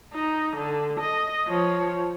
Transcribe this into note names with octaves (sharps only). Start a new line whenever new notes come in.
D#4
D3
D#5
F3 C#5